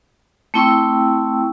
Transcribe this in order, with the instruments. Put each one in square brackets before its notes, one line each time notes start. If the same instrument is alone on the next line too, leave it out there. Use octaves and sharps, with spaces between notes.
[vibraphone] A3 C4 E4 G5 C#6 E6